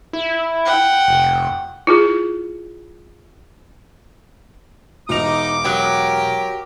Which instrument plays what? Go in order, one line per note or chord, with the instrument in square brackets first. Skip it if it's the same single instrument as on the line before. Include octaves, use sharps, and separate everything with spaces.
[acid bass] E4
[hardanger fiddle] F#5 G5
[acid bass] F1
[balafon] E4 F4 G#4
[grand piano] E1 F7 [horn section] D#4 [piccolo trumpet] D6
[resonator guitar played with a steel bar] F#3 [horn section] G4 A#4